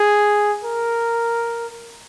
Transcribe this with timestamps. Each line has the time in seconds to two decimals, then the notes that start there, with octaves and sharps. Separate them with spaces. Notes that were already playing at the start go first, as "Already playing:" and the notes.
Already playing: G#4
0.65 A#4